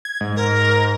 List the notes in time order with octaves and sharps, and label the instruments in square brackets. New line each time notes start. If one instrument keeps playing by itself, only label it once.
[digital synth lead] G#6
G#2
[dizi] A#4